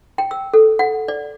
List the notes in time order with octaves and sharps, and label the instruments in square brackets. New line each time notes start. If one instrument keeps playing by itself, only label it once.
[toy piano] G5
E6
A4
F#5
D5